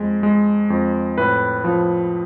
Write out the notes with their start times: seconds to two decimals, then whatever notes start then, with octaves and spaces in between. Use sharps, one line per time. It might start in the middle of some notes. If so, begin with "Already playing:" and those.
Already playing: F2 G#3
0.23 G#3
0.70 F2
1.18 A2 B4
1.64 F3